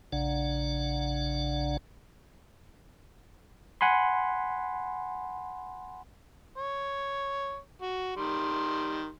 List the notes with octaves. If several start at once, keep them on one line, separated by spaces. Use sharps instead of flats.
A#1 C#3 D4 D5 F#5
F#5 G#5 B5 C6
C#5
F#4
D#3 G3 C6